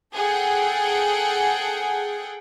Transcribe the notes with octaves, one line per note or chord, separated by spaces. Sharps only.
G#4 A4 F#5 G5